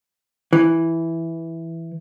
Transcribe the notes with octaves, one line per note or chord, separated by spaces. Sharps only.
E3